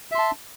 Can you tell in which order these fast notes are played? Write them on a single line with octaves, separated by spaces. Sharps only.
E5 C6 A5